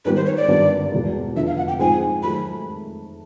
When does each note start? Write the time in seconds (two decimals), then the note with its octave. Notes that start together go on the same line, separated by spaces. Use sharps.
0.05 G#2 D#3 G3 B3 B4
0.16 C5
0.26 C#5
0.37 D5
0.48 G#1 G2 D3 G3 B3
0.92 E2 B2 G#3
1.35 F1 F2 D3 E5
1.47 F5
1.57 F#5
1.68 G5
1.79 G#2 F3 G#3 C4 D#4 G#5
2.23 D#3 F#3 A3 B5